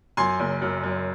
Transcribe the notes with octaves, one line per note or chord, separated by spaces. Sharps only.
F#2 G#5 C6
F#1
F#2
F#2